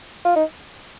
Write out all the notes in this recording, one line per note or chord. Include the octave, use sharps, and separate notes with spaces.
F4
D#4